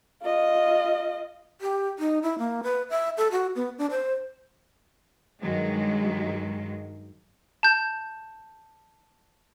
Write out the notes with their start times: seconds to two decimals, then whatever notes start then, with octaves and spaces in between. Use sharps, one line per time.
0.23 F4 D#5
1.61 G4
1.99 D#4
2.23 E4
2.39 A#3
2.63 B4
2.90 E5
3.18 A4
3.32 F#4
3.56 B3
3.78 D4
3.91 C5
5.41 G2 D#3 F#3 G#3
7.63 A5 G6